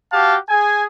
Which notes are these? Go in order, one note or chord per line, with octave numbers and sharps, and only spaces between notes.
F#4 G4 F5 A5
G#4 G#5